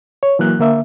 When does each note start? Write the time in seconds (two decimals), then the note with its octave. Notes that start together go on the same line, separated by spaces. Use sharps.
0.23 C#5
0.39 E3 F#3 A#3 F#6
0.59 D3 A#3 E5